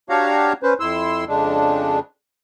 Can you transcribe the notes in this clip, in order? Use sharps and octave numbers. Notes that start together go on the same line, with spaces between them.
D4 F#4 G4 C#5 F5 A#5
C#4 B4 C5
F2 E4 C6 E6
F2 C#3 G#3 D4